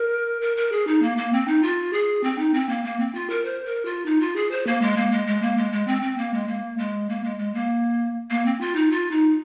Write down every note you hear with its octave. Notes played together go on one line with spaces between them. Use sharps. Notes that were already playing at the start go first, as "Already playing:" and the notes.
Already playing: A#4
A#4
A#4
G#4
D#4
A#3
A#3
C4
D#4
F4
G#4
C4
D#4
C4
A#3
A#3
C4
F4
A#4
C5
A#4
F4
D#4
F4
G#4
C5
A#3
G#3
A#3
G#3
G#3
A#3
G#3
G#3
C4
C4
A#3
G#3
A#3
G#3
A#3
G#3
G#3
A#3
A#3
C4
F4
D#4
F4
D#4